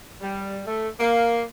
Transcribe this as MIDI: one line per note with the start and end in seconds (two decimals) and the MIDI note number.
0.22 0.60 55
0.67 0.88 57
1.00 1.42 58